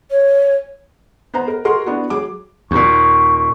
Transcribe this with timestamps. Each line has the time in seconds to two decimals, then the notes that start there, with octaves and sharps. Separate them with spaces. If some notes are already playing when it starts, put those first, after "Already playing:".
0.10 C#5
1.34 B3 C5 A#5
1.48 A#4
1.65 F#4 G#4 A#4 C6
1.86 B3 D4 E4 F#4
2.10 F#3 G#4 D6
2.71 D#2 A#2 C#6